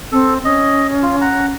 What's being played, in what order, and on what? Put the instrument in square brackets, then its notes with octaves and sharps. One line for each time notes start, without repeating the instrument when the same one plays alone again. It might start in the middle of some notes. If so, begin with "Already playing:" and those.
[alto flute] C4 [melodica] A4
[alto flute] C#4 [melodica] D#5
[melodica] F4
F#5 A#5